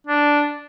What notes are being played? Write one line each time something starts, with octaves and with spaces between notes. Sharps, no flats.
D4